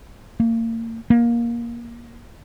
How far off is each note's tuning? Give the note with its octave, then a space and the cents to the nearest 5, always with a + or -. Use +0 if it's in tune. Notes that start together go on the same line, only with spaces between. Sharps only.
A#3 -35
A#3 +15